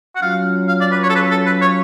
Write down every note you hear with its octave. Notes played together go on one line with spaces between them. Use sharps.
F#5
F#3 C#4 F4 F5
F5
D5
B4
C#5
A4
B4
A4
B4
C#5